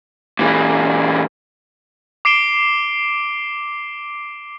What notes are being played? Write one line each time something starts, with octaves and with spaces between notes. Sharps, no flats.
A#2 E3
D6 C7 D7 E7 G7